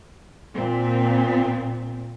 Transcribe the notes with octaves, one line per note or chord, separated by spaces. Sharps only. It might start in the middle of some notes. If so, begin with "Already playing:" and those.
A#2 C4